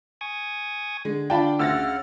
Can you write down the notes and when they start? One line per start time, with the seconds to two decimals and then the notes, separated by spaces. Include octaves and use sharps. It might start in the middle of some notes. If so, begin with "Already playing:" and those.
0.21 G#5 C#6 D#6
1.05 D3 G#3
1.30 D4 F4 G5 A5 B5
1.59 D2 C#3 F#5 E6 F6 A6 A#6